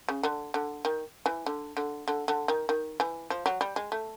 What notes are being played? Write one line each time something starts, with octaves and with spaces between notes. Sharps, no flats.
C#3
D3
D3
D#3
E3
D3
D3
D3
D3
D#3
D#3
E3
F3
F#3
G3
G#3
A3